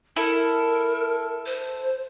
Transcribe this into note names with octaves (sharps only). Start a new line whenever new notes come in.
E4 A4 A#4
C5